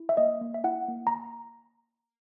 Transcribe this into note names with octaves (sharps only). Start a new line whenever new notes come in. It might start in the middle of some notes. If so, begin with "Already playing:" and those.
Already playing: E4
E5
A#3 D#5
A#3
E5
E4 F#5
A#3
A#5